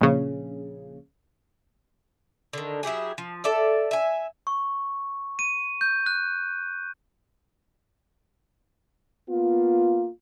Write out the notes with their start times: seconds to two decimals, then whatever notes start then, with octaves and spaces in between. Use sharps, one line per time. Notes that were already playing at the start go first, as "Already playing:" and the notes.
0.01 A#1 C#3
2.53 D3 D#3
2.83 F#3 E4 G4 G#4
3.18 F3
3.44 A4 D5 E5
3.91 E5 G#5
4.47 C#6
5.39 D#7
5.81 G6
6.06 F#6
9.30 A#3 B3 F4